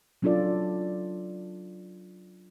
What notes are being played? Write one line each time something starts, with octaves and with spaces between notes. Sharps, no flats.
F#3 C#4 D4 F4 A4 D5